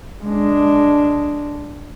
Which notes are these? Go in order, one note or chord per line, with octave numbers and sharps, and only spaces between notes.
G#3 D4